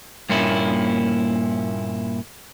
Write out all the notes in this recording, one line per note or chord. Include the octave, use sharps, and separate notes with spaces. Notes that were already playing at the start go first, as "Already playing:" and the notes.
G2 A#2 A#3 C#4 E4